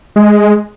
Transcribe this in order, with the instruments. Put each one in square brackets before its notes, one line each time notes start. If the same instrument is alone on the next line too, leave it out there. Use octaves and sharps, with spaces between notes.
[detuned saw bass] G#3